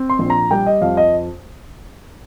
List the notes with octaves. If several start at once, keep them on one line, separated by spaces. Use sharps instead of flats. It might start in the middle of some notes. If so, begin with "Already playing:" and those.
Already playing: C4
C6
A#1
A#5
G3 G5
D#5
F2 F5
D#5